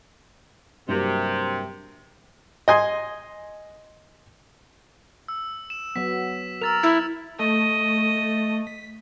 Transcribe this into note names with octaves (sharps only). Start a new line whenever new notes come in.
G2 C3 F#3 A#3
D#5 G#5 C6
E6
E7
F#3 B3 B6
A#4 E6 A6 F7
E4
A3 D#5
B6